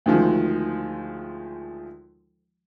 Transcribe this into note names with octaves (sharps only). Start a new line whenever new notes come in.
D2 D#3 F3 G#3